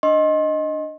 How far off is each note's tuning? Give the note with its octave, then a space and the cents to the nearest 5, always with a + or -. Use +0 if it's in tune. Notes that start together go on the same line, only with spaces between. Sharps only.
D4 +0 D#5 +0 C6 +35